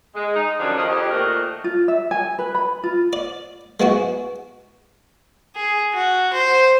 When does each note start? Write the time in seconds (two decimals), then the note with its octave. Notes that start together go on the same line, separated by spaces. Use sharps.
0.15 G#3
0.35 D#4
0.59 F#2 D3 F3 G3 C#4 D4
0.76 D#3 F3 D#5
0.89 F2 G4
1.10 A#2 D#3 A3 F#4 A#4 C5
1.64 F4
1.88 E5
2.11 G#5
2.39 B4
2.55 B5
2.84 F4
3.13 D5
3.80 G#3 B3 E4 F#4
5.55 G#4
5.93 F#4
6.33 C5